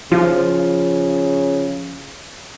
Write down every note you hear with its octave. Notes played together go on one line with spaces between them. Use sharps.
C#3 F3 F4